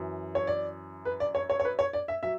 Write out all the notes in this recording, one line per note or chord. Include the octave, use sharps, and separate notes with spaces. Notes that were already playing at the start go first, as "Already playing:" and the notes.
Already playing: F#2 E3
C#5
D5
B4
D5
C#5
C#5
C#5
B4
C#5
D5
E5
F#3 E5